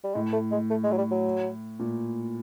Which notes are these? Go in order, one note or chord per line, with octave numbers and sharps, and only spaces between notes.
G3
A2 G#3
A3
G#3
A3
G#3
F#3
G3
F#3
A#2